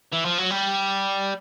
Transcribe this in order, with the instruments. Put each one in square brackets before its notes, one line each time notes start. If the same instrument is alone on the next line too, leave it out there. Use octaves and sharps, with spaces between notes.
[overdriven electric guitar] E3
F3
F#3
G3